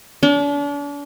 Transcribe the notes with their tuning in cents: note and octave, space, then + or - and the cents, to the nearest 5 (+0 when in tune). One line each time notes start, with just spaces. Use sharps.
D4 -40